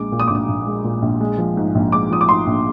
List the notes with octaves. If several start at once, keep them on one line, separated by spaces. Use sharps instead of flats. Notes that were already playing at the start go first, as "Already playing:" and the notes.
Already playing: A#1 G#3 D6
A#2
D#6
A#1 D6
D#6
A#1
G#3
A#2
A#1
G#3
F3
G#2
A#1
G#3 D6
F3 D#6
D6
G#2 C6
A#1